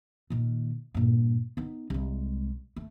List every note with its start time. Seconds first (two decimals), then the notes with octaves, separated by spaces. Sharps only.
0.30 A#2 D#3
0.94 G2 A#2
1.57 B3 D#4
1.90 C2 G#3
2.76 A3